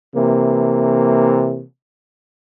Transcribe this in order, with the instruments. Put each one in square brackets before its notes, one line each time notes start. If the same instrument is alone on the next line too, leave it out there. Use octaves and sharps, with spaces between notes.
[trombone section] C3 E3 A#3